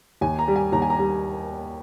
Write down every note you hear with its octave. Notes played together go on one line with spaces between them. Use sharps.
D#2 G#5
A#5
G3
G#5
D#2 A#5
G#5
A#5
G3